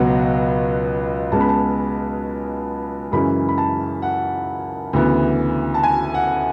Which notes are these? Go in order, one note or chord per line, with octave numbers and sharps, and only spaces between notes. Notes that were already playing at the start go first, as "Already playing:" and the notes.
Already playing: C#2 B2 F#3 B3 F#5
C#2 C#3 G#3 B3 A5
B5
A5
F#2 C#3 E3 G#3 B5
B5
A5
F#5
D2 C#3 E3 B3
A5
G#5
F#5